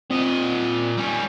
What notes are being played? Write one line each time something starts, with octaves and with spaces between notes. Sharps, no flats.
A#2 C4 D#5
G3 C#4